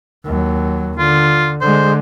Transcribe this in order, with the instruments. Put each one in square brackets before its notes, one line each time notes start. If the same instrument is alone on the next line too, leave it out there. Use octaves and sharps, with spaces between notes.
[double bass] D#2 F#3
[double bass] D3 [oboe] F4
[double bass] D3 G#3 [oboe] C5